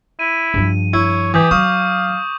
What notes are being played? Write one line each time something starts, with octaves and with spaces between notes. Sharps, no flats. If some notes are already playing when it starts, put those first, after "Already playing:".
E4 D#7
G2 F3
E4 C#5
E3 G4 D6 D#6 G6
F#3 F5 C#6 D#6